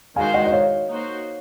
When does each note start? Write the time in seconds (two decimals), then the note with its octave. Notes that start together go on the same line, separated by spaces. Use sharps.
0.16 D#3 G#3 D#4 F#4 C5 F5 G#5
0.34 D#5 F#5
0.46 D#5
0.52 C#5 F5
0.89 A#3 D#4 F#4 C5